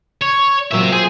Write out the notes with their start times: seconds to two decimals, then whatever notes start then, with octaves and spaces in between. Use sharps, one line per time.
0.22 C#5
0.72 A#2 F#3 C4 E5
0.92 G#4 C5